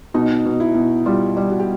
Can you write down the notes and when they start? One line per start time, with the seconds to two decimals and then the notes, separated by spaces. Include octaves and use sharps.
0.14 B2 D#4
0.45 B2
0.60 E4
0.75 B2
1.06 G3 F4
1.37 G3
1.51 F#4
1.59 G4